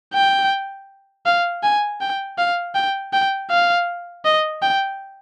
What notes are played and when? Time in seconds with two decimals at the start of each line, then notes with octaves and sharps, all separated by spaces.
0.14 G5
1.26 F5
1.63 G#5
2.01 G5
2.38 F5
2.75 G5
3.13 G5
3.51 F5
4.25 D#5
4.62 G5